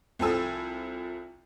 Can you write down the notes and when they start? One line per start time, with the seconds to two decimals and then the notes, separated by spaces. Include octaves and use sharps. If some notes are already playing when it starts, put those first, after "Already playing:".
0.19 C2 F3 A4 G#5 E6